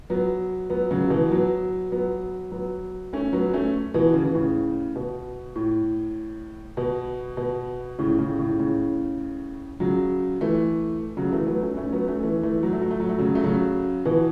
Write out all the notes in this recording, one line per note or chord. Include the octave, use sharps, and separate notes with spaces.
F#3 B3
F#3 B3
C#3 F#3
B2 E3
F#3 B3
F#3 B3
F#3 B3
A3 C#4
F#3 B3
A3 C#4
B2 E3
C#3
E3
A2 C#3
B2
A2
B2
B2
A2 C#3
A2 C#3
A2 C#3
A2 C#3
C#3 F#3
E3 A3
C#3 F#3
E3 A3
F#3 B3
A3 C#4
A3 C#4
F#3 B3
A3 C#4
E3 A3
E3 A3
F#3
A3
F#3
A3
F#3
A3
C#3 F#3
A3
C#3 F#3
B2 E3